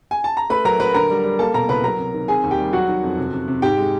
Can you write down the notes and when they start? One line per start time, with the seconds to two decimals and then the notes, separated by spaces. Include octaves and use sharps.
0.11 G#5
0.24 A5
0.37 A#5
0.50 A3 B4 B5
0.65 F#3 A#4 A#5
0.80 F#3 B4 B5
0.94 D3 A#4 A#5
1.10 G3
1.24 G3
1.39 A#3 A4 A5
1.54 B2 A#4 A#5
1.69 C2 B4 B5
1.84 F#3 A#4 A#5
1.99 C3
2.14 D#3
2.28 C4 G#4 G#5
2.44 D#2
2.51 G4 G5
2.58 G3
2.73 F#3 F#4 F#5
2.88 D#3
3.03 F2
3.18 C3
3.33 C3
3.48 C3
3.62 G#2 G4 G5
3.78 G#3